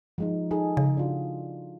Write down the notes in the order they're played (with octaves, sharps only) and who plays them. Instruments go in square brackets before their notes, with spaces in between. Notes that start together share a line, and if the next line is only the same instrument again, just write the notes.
[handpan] F3 G#3 D#4
D#4 G#4 A4
[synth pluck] C#3
[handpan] D4 F4 F#4